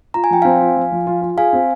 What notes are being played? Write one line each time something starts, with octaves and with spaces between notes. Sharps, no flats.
F4 A#5
G#5
F3 G5
C4 F5 G#5
F4
F3
F3
F4
F4
G#4 F5 G#5
C4